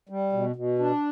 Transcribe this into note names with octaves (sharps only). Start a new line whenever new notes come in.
G3
B2
B2
D4